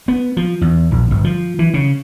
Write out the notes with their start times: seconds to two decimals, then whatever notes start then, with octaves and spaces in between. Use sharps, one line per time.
0.08 B3
0.37 F3
0.61 E2
0.91 A#1
1.11 G1
1.24 F3
1.59 E3
1.74 C#3